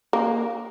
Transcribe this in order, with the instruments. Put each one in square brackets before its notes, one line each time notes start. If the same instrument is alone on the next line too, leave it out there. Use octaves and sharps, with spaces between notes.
[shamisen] A#3